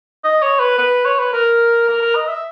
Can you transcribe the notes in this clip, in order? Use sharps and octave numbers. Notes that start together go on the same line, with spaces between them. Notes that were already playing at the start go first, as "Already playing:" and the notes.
D#5
C#5
B4
B4
C#5
B4
A#4
A#4
A#4
D#5
E5